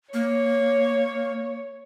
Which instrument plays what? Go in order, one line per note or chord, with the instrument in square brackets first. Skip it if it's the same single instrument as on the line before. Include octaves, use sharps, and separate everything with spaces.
[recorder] A#3 [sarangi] C#5